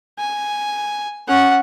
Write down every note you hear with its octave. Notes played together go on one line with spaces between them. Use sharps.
G#5
C#4 F#5